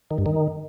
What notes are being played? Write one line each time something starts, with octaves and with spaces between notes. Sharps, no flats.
D#3
G2
D#3